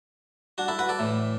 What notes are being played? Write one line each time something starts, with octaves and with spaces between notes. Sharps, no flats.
D4 F#4
E4 A4
F#4 B4
A4 D5
A2 E3